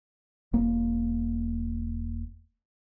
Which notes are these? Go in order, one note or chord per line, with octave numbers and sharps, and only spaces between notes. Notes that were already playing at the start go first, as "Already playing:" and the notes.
E1 A#3